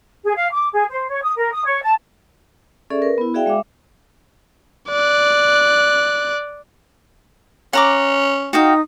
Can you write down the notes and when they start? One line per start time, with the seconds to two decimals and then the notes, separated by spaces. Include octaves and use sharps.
0.24 G#4
0.36 F5
0.53 D6
0.73 G#4
0.91 C5
1.09 C#5
1.22 D#6
1.36 A#4
1.52 D#6
1.65 C#5
1.83 A5
2.90 C#4 G#4 A4 D5 E5 C#6
3.02 A#4 B4
3.18 B3 E4
3.34 F#4 G#4 D5 E5 F5 G5
3.46 G#3 E5 F5 D6
4.89 D5 F#6
7.73 C#4 F#5 A#5 D6
8.53 D#4 F#4 F5 G5 D#6